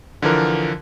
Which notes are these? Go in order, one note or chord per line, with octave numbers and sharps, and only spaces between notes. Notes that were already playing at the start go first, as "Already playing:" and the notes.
D3 E3 F3 A#4